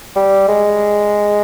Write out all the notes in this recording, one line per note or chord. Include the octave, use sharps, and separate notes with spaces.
G3
G#3